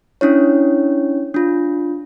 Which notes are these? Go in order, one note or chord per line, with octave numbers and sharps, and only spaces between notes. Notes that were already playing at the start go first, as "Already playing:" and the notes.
C#4 D4 E4 C#5
D4 F4